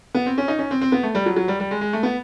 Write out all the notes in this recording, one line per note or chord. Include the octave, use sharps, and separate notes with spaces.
B3
C4
C#4
D#4
C#4
C4
C4
B3
A3
G3
F#3
F#3
G3
G3
G#3
G#3
A3
B3